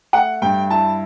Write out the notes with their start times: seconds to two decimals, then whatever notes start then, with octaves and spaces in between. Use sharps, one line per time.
0.13 A3 F#5
0.42 G2 G5
0.70 E4 A5